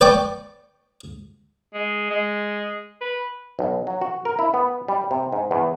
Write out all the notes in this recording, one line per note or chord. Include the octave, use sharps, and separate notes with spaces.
B4 D5 G5 C#6 D6
G#3
G#3
B4
B1
F#3
F#4
A#4
E4
B3
G3
C3
G#2
E2